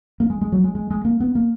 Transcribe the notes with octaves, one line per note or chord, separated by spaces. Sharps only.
A#3
G#3
G#3
F#3
G#3
G#3
G#3
A#3
B3
A#3